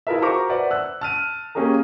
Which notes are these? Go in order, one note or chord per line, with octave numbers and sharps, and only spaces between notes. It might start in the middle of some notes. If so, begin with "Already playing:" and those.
E4 F4 G#4 A#4 B4 E5
F#4 A#4 C5 A#5 C#6 D6
B4 C5 D5 E5 F#5
E6 F#6
A5 F6 D#7
A#3 C#4 G4 G#4 A#4